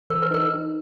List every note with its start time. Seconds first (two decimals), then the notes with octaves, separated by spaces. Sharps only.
0.10 E3 A#4
0.22 B4
0.31 D#4 A#4
0.50 D#4